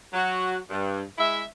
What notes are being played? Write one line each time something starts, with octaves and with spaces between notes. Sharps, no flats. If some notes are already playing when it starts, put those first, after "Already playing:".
F#3 F#4
G2
G#3 E4 E5